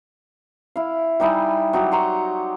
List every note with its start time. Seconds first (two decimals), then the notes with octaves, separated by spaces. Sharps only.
0.76 E4 F5
1.20 G3 D#4 E4 G#5
1.73 F#3 D#4 G4
1.92 A#5 C6 C#6